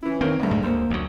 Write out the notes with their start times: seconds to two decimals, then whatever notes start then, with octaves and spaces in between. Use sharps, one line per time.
0.03 E3 C#4 E4
0.21 D#3 C4 A#4 C#5 F5
0.40 D2 G2 A3
0.51 G#2
0.63 D2 A#3 C5
0.90 D2 F#3